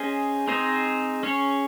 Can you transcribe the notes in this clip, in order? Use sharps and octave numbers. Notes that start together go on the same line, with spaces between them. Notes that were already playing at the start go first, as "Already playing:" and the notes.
Already playing: C#4 G#4 C5 D#5
C4 D#4 G#4 C5 D#5
C#4 G#4 C#5